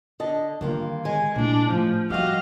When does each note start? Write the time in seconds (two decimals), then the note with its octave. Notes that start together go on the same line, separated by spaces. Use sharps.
0.20 D3 D#5 A5
0.61 G2 D3 D#3 A#3 F4
1.05 G#3 G#5
1.35 A#2 D4 E4
1.70 A2 F3
2.10 F3 G3 F#4 G4 D#5 F5